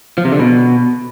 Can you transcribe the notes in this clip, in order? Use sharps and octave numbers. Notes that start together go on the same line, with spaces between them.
F3
C3
D3
B2